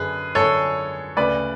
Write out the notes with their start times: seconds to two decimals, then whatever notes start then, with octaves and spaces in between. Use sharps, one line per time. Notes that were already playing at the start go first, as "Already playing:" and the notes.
Already playing: F#2 D3 G#4 B4
0.35 F#2 A4 C#5
0.40 D3
1.17 D2 C#3 B4 D5